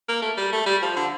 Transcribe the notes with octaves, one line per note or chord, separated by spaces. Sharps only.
A#3
A3
G3
A3
G3
F3
D3